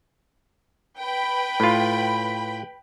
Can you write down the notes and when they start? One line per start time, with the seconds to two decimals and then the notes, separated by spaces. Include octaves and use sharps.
0.96 B4 G5 B5
1.60 A2 F4